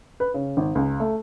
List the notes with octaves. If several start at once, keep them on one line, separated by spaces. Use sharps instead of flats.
B4
C#3
G#1
C#2
A3